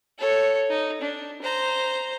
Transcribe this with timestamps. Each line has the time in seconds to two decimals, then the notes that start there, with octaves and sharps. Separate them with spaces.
0.18 A4 C#5
0.70 D#4
1.02 D4
1.42 C5 A#5